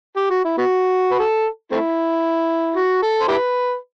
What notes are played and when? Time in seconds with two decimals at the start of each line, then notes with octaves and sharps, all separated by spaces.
0.16 G4
0.30 F#4
0.45 E4
0.58 B3 F#4
1.11 B4
1.20 A4
1.72 A3 C4 E4
2.76 F#4
3.02 A4
3.20 C5
3.28 E4 G4 B4